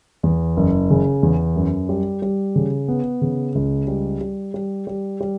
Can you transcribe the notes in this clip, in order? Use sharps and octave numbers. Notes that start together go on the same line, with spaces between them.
E2
F#1
C#3
E2
F#2
G3
G3
C#3
B3
C#3
C#2
G3
G3
G3
G3
G3